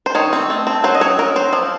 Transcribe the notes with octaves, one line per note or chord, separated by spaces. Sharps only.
C5
D#3 C#5
C4
A3
C4
F#3 C5
D#5
F#3 C#5
F#3 A#4
F#3 C5
F3